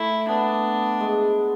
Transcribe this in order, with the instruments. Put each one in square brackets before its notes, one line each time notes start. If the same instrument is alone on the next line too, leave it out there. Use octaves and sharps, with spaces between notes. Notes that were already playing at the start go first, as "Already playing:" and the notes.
Already playing: [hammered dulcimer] A3 [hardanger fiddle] E4
[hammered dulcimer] B3 [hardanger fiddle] D4
[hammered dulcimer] G#3